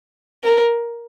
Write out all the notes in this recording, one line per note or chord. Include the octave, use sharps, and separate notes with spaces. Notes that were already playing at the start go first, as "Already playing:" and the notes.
A#4